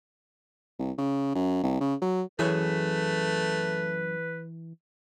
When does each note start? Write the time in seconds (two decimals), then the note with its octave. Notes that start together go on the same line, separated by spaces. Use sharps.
0.79 C2
0.98 C#3
1.35 F#2
1.64 C2
1.81 C#3
2.02 F#3
2.39 F#2 E3 A3 G#4 B4 C#5